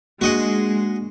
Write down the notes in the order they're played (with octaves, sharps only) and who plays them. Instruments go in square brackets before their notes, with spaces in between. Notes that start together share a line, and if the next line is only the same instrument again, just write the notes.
[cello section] G#3 [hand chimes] A#3 D4 [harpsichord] F#4 D#5 F#5